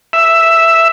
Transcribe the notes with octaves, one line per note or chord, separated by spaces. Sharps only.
E5